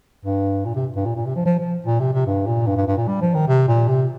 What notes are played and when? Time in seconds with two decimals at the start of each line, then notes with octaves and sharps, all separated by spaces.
0.25 G2
0.65 A#2
0.75 C3
0.96 G2
1.06 A#2
1.16 A#2
1.26 C3
1.36 F3
1.46 F3
1.59 F3
1.86 A#2
2.00 C3
2.13 C3
2.27 G2
2.46 A#2
2.67 G2
2.77 G2
2.88 G2
2.97 A#2
3.08 G3
3.21 F3
3.34 D#3
3.48 C3
3.68 A#2
3.88 C3